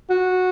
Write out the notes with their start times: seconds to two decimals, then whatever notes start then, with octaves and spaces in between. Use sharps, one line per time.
0.10 F#4